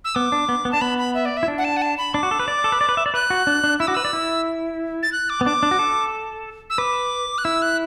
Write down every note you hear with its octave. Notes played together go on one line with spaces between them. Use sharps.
E6
B3 D6
D4
B3
B3
D4 A5
B3 B5
B5
E5
D5
E5
E4
D4
F#5
A5
F#5
A5
B5
D4 D6
F#4
A4
B4
D5
A4
B4
D5
B4
E5
D5
B4 F#6
F#4
D4
D4
E4 E6
F#4 D6
B4 E6
D5
E4
A6
F#6
D6
B3
D4 D6
D4
F#4
A4
E6
B4 D6
F#6
E4 E6
F#6